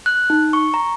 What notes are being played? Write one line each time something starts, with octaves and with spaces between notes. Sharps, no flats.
F#6
D#4
C#6
A#5